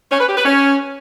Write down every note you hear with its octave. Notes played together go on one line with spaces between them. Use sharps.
C#4
B4
G4
B4
C#4